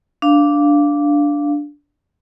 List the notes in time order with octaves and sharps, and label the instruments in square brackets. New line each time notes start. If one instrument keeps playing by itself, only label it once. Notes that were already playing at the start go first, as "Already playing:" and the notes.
[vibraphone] D4 F5